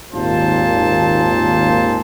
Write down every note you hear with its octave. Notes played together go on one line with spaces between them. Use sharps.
G#1 D#2 A#2 F4 C5 A5